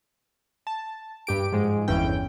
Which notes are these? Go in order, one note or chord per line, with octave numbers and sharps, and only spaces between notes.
A5
G2 G4 D7
G#2 F3 G#3
G1 E2 G2 E3 C#4 G5